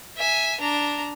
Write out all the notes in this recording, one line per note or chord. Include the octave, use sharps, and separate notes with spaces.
E5 G#5
D4 A#5